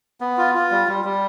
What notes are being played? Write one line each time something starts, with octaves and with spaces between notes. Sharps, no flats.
B3
F4
F4
G3
G3
G3